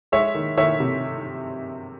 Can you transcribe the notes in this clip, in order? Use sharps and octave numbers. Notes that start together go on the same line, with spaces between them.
G#3 C#5 E5
D#3
D#3 C#5 E5
C3